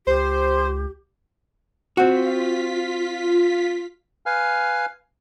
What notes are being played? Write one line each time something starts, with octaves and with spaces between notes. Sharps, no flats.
C#2 G4 C5
C4 F4 F#4 B6
B4 F5 G#5 F6